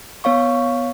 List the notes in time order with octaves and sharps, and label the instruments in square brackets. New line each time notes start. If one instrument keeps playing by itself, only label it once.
[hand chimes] B3 C#5 F5 C#6